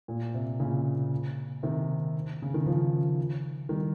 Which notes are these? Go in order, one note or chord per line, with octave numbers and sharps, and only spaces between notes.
A#2
C3
A#2 C#3
C3 D#3
C#3
D#3
C#3 F3
D#3 G3